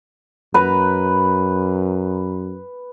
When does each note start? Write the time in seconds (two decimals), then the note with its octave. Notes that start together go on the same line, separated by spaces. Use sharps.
0.54 F#2 B4 A#5